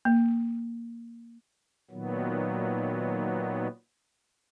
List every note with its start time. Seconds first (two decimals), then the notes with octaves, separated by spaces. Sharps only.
0.05 A#3
1.91 A#2 D#3 F#3 B3